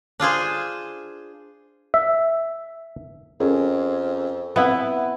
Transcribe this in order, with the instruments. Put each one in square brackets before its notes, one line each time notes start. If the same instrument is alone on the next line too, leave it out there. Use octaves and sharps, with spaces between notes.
[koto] D4 F4 G#4 C5
[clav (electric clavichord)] E5
[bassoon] F2 [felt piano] C#4 G#4 A#4
[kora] B3 E4 [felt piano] C4 E5 F#5